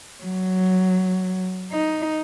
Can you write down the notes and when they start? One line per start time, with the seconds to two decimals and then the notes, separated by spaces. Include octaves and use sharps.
0.24 F#3
1.73 D#4